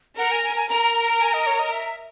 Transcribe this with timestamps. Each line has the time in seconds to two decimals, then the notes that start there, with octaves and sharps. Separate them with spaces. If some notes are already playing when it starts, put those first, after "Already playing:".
0.18 A#4 F#5
0.32 G#5
0.44 G#5
0.57 G#5
0.69 A#4 A#5
1.20 G#5
1.34 D#5
1.47 C#5
1.59 D#5
1.72 E5